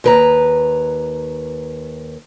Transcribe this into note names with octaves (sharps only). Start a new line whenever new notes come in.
D#2 B4 A#5